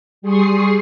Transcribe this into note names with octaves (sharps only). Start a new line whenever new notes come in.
G3 G#4 C6 C#6 D#6 C7